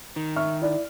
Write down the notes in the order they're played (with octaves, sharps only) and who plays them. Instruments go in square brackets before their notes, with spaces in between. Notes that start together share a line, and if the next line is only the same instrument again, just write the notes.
[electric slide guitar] D#3
[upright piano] E5 C#6 F6
E4 D5